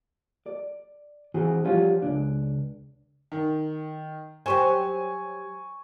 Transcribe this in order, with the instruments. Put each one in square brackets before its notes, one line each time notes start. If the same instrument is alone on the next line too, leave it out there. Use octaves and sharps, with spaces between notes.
[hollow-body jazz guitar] D5
E3 C4 F#4 G#4
F3 G3 C#4 F4 F#4
C#2 D4
[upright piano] D#3
[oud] F#3 G4 C5 [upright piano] G#5 C#6